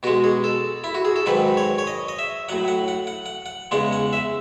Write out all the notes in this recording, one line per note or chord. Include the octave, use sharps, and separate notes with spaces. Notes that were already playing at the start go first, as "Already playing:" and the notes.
B2 G#3 F#4
G#4
A4
E4
F#4
G#4
A4
G#2 D#3 F#3 B4
C#5
C#5
D#5
D#5
E5
A2 F#3 F#5
F#5
F#5
F#5
F#5
F#5
E2 C#3 G#3 F#5
F#5
E5